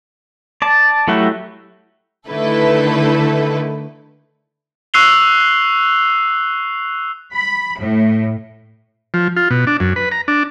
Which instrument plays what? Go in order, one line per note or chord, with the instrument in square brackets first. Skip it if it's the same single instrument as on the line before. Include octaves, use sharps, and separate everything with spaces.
[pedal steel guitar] D5 A5
F#3 A3 E4 F#4 G4
[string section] D3 D#3 A3 E4 A4 B4
[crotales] C#6 E6 F#6 C7 F7 G7
[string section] B5
A2
[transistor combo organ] F3
F4
B2
D4
F#2
B4
A#5
D4